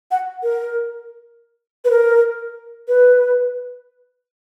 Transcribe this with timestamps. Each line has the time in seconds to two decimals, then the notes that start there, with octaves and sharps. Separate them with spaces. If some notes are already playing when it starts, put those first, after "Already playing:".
0.11 F#5
0.43 A#4
1.85 B4
1.91 A#4
2.88 B4